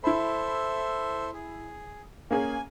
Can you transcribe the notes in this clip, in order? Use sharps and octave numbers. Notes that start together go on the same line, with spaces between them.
E4 A4 C5 E5 B5
G#4
A#3 C#4 G#4 G#5